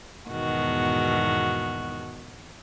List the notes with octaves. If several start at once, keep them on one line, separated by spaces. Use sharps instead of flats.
E2 G#2 B2 D#3 F#4